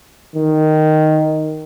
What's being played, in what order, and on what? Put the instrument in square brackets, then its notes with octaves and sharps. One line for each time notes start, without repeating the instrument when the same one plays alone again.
[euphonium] D#3